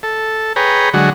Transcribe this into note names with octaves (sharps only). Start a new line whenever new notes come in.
A4
G#4 B4 C#5 G5 A#5
D3 F#3 G#3 F#4